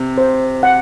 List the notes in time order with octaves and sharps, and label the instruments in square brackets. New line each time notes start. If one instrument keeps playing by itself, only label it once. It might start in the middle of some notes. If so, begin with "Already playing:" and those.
Already playing: [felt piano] C3
[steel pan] C5
F#5